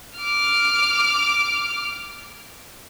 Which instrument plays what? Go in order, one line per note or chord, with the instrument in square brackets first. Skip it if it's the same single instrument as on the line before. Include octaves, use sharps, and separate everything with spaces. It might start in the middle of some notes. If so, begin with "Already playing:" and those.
[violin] D6 F6